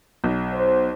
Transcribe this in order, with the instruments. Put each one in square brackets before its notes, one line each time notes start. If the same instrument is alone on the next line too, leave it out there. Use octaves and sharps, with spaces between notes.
[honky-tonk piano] B1
[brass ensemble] C5